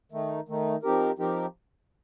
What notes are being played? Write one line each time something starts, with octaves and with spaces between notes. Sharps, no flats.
D#3 A3 D#4
D#3 A3 D#4
F3 C4 D#4 G4 A#4
F3 C4 D#4 G4 A#4